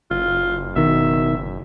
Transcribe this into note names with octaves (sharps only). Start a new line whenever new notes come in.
F#1 F4
B2 D#3 E5